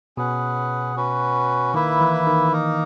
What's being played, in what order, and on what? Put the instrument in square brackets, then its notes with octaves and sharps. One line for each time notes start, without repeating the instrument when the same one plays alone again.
[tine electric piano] B2 [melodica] C#4 G#4 B4 F#5
[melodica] C#4 F#4 B4
[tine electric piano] D#3 [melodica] A#3 E4 B4 E5
[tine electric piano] E3
D#3
[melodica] A#3 D#4 A#4